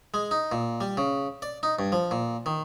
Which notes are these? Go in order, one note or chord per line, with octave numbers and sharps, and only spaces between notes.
G#3
D#4
A#2
G3
C#3
D5
D#4
G2
F3
A#2
D#3